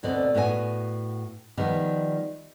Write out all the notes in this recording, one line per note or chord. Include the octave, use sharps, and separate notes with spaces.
D2 B2 C4 D5
A2 B3 F#4 D#5 G#5
D#3 F3 G3 B3